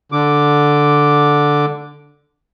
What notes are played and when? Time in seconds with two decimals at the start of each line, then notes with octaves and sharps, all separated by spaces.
0.12 D3 D6